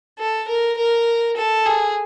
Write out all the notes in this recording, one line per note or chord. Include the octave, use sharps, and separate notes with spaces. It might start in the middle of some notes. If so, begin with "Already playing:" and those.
A4
A#4
A#4
A4
G#4